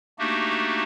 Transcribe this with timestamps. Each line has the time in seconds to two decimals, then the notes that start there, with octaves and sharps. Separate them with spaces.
0.19 A3 A#3 D4 D#4 F#4 G4